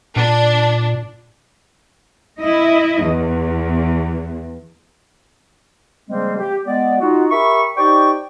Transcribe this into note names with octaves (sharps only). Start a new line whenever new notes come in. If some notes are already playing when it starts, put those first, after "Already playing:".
A#2 D4
E4 D#5
E2
C#3 F3 G3 G#3 A#3 C4
G4
G#3 B3 D5
D#4 F4 F#4
G4 A#4 E5 B5 C#6
D#4 G4 C5 D5 G5 C#6